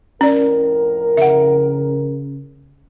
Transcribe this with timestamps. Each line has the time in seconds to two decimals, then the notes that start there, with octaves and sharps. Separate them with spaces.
0.21 F2 A2 C#4 A#4 D5
1.17 C#3 E5 F#5